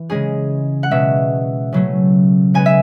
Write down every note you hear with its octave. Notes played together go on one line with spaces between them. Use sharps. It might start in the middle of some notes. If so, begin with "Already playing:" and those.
Already playing: E3
C#3 G#3 C#4 G#4
F#5
B2 G#3 C#4 E5
C#3 F#3 A3 C#4
C#3 G#3 B3 G#5
E5